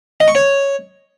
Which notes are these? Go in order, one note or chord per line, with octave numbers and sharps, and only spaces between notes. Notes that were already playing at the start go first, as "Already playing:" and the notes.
D#5
C#6
C#5